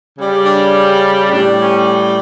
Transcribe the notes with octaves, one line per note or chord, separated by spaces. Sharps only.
C#3 G3
D4
A2 G3 D4
C#4